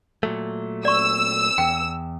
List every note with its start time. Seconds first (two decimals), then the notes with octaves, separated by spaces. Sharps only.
0.23 A#2 F#3 A3
0.85 D5 C#6 E6
1.58 E2 G5